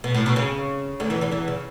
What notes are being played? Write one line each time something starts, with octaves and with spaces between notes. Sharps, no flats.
B2
A2
B2
C#3
D2 D3
E2 E3
E2 E3
E2 E3
C#3